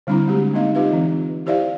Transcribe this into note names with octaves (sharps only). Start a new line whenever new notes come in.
D3 G3 C4 D4 E4 A#5
G#3 A3 F#4 G4
A#3 C4 D#4 D#5 F5
D#4 F4 G4 B4 E5 F5
E3 C4
E4 G4 C5 D5 E5 F5